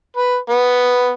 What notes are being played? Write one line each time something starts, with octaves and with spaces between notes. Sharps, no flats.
B4
B3